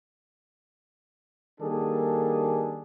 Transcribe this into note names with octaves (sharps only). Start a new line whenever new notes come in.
D#3 G3 A#3 D4 G#4 A4